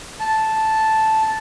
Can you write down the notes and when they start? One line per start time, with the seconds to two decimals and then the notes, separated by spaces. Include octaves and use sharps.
0.20 A5